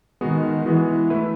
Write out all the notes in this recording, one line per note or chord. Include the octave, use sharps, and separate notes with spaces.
D#3 G#3 B3 F#4
E3 G#3 B3 F#4
A3 E4 B4